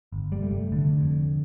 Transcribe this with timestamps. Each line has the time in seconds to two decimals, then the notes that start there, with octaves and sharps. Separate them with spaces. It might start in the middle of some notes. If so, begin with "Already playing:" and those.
0.12 G1
0.32 G3
0.42 F1 A3
0.72 F1 D3
1.01 F2